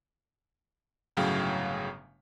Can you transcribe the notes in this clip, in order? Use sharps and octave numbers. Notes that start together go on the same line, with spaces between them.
G1 A2 C#3 F#3 F5 G5